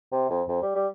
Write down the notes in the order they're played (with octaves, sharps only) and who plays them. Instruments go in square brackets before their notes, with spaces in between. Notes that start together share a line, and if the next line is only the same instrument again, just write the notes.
[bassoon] C3
F2
F2
G3
G3